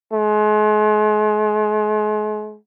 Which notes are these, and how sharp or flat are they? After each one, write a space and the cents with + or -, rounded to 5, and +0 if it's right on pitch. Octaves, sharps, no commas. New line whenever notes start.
G#3 +40